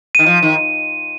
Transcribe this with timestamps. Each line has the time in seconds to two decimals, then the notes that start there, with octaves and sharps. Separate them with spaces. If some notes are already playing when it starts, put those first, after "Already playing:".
0.15 D#7
0.19 D#3
0.26 F3
0.43 D#3